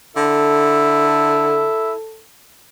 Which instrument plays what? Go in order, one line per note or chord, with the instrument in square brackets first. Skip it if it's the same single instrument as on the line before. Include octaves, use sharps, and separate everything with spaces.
[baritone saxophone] D3 [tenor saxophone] E4 [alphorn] A4